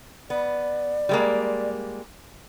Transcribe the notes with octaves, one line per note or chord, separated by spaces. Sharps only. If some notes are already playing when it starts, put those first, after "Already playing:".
B3 D5
G3 G#3 A#3